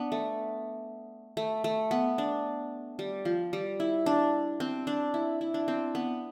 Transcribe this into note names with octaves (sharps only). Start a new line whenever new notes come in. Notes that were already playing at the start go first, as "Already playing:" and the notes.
Already playing: B3 D4
A3
A3
A3
B3
D4
G3
F3
G3
E4
D4
C4
D4
E4
E4
D4
C4
B3